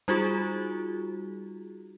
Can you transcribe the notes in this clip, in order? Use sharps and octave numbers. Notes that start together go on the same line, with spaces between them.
G3 D#4 F4 F#4 G#4